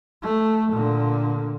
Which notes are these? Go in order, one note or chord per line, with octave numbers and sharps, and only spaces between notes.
A3
A#2 D3